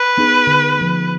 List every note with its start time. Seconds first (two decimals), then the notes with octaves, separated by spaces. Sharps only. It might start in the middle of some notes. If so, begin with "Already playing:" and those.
Already playing: B4
0.18 B3 D#4 G#4
0.47 D3
0.77 F3 A3